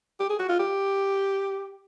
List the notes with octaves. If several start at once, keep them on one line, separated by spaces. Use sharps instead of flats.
G4
G#4
F#4
F4
G4